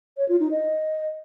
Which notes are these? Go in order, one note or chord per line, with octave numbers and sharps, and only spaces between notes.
C#5
F4
D#4
D#5